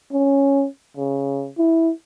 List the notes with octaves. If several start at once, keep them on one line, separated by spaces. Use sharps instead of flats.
C#4
C#3
E4